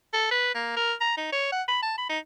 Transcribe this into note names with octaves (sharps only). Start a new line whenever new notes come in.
A4
B4
A#3
A#4
A#5
D#4
C#5
F#5
B5
A5
B5
D#4